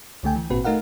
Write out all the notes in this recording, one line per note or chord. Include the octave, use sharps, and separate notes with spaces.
C#2 D3 A3 G5 G#5
E3
G#1 A#2 C4 F#4 B4
A3 D#4 A#4 F5 F#5